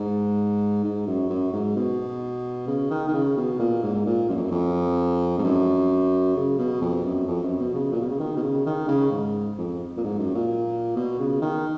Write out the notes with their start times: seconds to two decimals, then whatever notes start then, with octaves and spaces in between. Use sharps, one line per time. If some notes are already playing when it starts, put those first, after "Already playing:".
Already playing: G#2
0.84 G#2
1.07 F#2
1.30 F#2
1.53 G#2
1.76 B2
2.67 C#3
2.91 D#3
3.08 D#3
3.14 C#3
3.37 B2
3.59 A#2
3.83 G#2
3.94 G#2
4.06 A#2
4.29 F#2
4.37 F2
4.44 F#2
4.52 F2
5.38 G#2
5.44 F#2
6.36 C#3
6.59 B2
6.81 F2
7.05 F#2
7.27 F2
7.43 F#2
7.59 B2
7.75 C#3
7.92 A#2
8.01 B2
8.11 C#3
8.20 D#3
8.37 B2
8.43 C#3
8.66 D#3
8.88 C#3
9.11 G#2
9.58 F2
9.97 A#2
10.04 G#2
10.19 F#2
10.35 A#2
10.96 B2
11.20 C#3
11.41 D#3